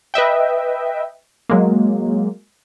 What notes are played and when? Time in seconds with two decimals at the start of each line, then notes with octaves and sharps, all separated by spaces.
0.14 B4 D#5 E5 G5
1.49 F#3 G#3 A#3